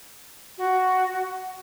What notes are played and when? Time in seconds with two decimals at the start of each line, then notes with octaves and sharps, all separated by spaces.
0.58 F#4